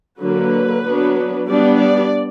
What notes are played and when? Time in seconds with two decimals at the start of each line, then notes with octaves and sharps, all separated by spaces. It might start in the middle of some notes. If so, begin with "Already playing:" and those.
0.19 D3 F#3 A#3 B4
0.82 F#3 B3 D4
1.47 G3 B3 D4 D5
1.79 D5